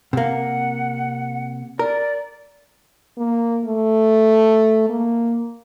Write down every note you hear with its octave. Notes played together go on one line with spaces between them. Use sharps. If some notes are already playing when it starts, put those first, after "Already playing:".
C3 A#3 F#5
A#4 D5
A#3
A3
A#3